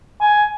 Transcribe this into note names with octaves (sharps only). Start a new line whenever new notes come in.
G#5